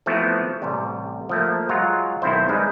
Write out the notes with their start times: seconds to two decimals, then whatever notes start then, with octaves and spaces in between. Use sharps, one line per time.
0.06 E3 F3 A3 B3 C4 F#4
0.62 A1 C3 G3
1.29 F3 A3 A#3
1.69 F#3 G#3 F4 C#5 A#5
2.22 B1 D#3 C4 E4 C5
2.49 G3 G#3 D#4 B4